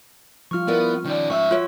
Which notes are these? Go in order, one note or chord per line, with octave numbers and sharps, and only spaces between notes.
F3 G3 F4 C#6 F6
B3 E4 A#4 D5
D#3 C#4 D5
G#2 E5 C#6 E6
F4 F#4 B4 C#5